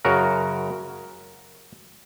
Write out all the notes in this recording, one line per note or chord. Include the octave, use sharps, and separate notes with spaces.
F#2 C#3 F#4 A#4